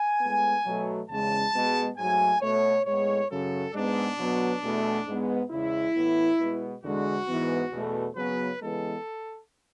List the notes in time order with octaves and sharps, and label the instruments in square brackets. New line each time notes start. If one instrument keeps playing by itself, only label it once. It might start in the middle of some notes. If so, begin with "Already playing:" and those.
Already playing: [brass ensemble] G#5
A2 G#3 B3
B2 F#3 A3
E2 C#3 G#3 A5
B2 G#3 B3
G#2 F#3 A3 G#5
B2 A3 C#5
A2 G#3 B3 C#5
F#2 C#3 F#3 A4
G#2 G#3 B3 D4
B2 F#3 B3
E2 B2 A3
G#2 G#3 B3
E2 C#3 G#3 E4
A2 E3 B3
B2 G#3 B3
E2 D3 G#3 F#4
G#2 E3 B3
E2 B2 A3
C#3 F#3 B3 B4
C#3 E3 G#3 B3 A4